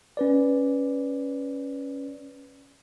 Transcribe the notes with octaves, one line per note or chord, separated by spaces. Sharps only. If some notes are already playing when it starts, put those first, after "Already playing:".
C#4 B4 D5